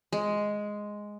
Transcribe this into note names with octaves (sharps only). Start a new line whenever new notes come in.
G#3